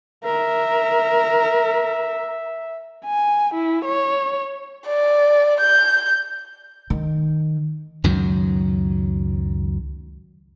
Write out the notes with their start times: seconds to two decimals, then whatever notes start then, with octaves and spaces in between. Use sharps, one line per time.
0.24 A#4 E5
3.05 G#5
3.55 E4
3.86 C#5
4.87 D5
5.60 G6
6.90 D#3
8.04 C#2 F#2 D#3 F#3